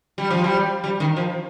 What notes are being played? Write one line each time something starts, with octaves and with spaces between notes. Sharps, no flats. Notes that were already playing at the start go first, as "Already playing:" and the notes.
G3
F3
G3
G3
D#3
F3